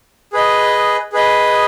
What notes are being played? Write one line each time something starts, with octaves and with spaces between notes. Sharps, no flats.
G#4 B4 D#5
G#4 B4 D#5